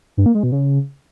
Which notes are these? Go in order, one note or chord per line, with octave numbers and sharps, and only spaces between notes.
G2
A#3
G#3
B2
C#3